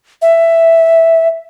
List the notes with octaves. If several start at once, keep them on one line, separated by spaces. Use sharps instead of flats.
E5